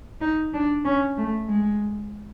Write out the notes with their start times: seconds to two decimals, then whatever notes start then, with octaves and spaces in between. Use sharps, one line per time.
0.21 D#4
0.54 D4
0.85 C#4
1.18 A3
1.49 G#3